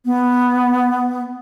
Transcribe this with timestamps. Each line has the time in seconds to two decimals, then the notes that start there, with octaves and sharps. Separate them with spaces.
0.05 B3